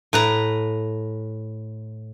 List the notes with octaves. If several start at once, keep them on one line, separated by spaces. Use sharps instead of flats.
A2 B4 A#5